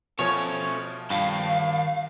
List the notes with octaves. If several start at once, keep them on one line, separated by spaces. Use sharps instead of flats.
B2 F3 A4 C#5 E5 G#5
G2 D#3 F3 F5 G5 A5